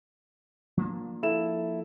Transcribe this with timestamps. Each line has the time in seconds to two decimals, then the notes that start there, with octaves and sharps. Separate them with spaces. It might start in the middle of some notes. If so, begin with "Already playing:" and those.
0.77 F3 A#3 D4
1.23 E4 A4 E7